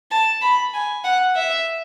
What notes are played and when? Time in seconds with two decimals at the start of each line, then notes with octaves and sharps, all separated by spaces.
0.11 A5
0.42 B5
0.74 G#5
1.04 F#5
1.36 E5